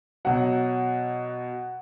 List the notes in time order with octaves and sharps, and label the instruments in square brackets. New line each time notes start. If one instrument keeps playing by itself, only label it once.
[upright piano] B2 F#3 F#5